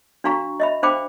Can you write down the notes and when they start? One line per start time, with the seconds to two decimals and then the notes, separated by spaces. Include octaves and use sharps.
0.24 D4 F#4 F5 A#5 C#6
0.60 D#5 E5 B5
0.83 D4 C5 F5 G5 B5 D6